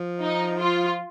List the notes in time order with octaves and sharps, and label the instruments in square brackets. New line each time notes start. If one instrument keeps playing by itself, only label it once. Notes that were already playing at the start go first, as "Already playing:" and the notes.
Already playing: [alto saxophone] F3
[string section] D#4
F4